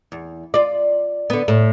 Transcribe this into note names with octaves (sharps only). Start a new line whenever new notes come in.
E2
F4 D5
D3 B3
A2